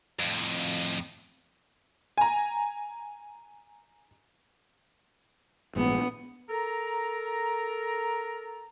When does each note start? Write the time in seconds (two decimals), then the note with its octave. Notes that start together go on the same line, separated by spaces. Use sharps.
0.19 F2 A2
2.18 G#5 A#5
5.76 A#1 G#2 B3
6.49 A4 A#4 A#5